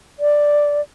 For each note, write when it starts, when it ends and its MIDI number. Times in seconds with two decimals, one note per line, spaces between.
0.20 0.81 74